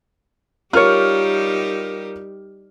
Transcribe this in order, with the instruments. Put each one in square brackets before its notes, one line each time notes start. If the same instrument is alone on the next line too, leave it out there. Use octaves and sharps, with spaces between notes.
[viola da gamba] G3 D#4 G4 [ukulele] F4 C#5 [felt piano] A#4 F6